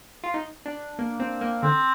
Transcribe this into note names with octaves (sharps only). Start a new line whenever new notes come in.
F4
D#4
D4
A#3
C4
A#3
D3 C4